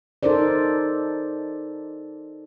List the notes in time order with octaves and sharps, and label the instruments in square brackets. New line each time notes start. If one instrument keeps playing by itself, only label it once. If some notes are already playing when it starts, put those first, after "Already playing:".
[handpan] D#4 A4 A#4 C5 D5